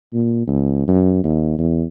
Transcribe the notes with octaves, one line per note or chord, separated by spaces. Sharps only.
A#2
C#2
F#2
D#2
E2